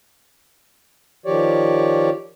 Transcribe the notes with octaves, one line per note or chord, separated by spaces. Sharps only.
D#3 F3 G4 C#5 D5